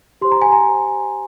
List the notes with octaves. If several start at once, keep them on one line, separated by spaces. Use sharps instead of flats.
G4 C5 C6
A#5
G#5
A#5